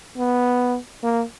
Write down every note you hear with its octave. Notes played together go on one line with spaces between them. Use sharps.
B3
A#3